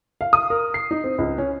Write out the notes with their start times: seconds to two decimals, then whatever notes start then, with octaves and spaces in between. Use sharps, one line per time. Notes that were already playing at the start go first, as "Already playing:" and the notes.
0.21 F5
0.33 D#6
0.50 A#4
0.74 C7
0.91 D#4
1.04 C4
1.18 C#2
1.38 C#4